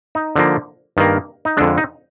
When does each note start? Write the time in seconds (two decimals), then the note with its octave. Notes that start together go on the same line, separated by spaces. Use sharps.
0.15 D#4
0.36 D3 F3 A#3
0.97 G2 D#3 A#3
1.45 D#4
1.57 F2 D3 G#3 D4
1.78 D#4